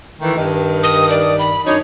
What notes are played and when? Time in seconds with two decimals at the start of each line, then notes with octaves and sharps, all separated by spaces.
0.21 D#3 E3 A3
0.37 G2 D#3
0.83 D#6
1.10 D5
1.39 B5
1.66 F#2 D4 D#4 C#5